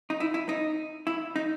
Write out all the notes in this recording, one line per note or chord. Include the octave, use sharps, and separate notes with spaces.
D#4
E4
E4
D#4
E4
D#4